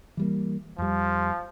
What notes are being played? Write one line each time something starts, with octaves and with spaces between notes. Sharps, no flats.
E3 G3 A#3
F2 F3 G3